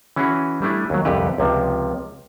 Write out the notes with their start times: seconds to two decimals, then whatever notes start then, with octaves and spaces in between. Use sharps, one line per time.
0.16 E3 C#4 E4 F#4 G#4
0.62 G3 A3 D4 E4 G#4
0.90 D#2 F#3
1.05 C2 F2 D3 G4 B4
1.38 C#2 C3 F3